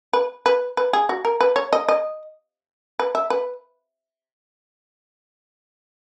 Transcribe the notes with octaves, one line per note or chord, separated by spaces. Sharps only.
B4
B4
B4
G#4
F#4
A#4
B4
C#5
D#5
D#5
B4
E5
B4